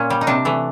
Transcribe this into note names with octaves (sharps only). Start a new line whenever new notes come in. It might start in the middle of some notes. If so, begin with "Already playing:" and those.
Already playing: A#2 C#4
G3
D#4
C3 D4
E3 A3